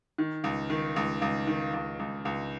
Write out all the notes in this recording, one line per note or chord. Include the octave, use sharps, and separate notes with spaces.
D#3
C#2
D#3
C#2
C#2
D#3
C#2
C#2
C#2